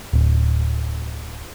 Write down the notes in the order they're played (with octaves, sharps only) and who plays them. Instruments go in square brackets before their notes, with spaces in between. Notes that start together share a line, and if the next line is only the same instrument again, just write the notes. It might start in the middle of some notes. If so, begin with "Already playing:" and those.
[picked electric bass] D1